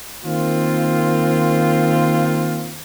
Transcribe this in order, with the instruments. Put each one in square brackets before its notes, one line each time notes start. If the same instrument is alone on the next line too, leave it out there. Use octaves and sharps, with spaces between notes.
[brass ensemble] D#3 A#3 C4 F4